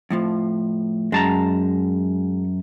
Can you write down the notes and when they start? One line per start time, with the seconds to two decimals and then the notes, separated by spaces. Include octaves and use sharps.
0.10 F2 A2 F3
1.12 F#2 G#3 A5 A#5